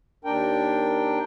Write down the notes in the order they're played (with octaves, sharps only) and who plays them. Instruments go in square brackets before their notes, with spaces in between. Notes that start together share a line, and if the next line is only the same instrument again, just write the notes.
[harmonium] D#2 D4 A#4 G5